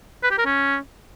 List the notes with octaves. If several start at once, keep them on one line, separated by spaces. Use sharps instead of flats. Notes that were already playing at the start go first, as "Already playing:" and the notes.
B4
G4
A#4
C#4